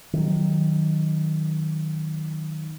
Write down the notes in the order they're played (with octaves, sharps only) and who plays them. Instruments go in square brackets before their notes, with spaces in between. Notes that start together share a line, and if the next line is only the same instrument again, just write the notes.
[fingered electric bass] D#3 F#3